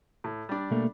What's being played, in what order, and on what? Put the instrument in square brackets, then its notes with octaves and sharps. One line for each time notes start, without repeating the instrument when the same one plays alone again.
[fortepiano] A2
G3 D4
[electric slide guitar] B2 A3 A#3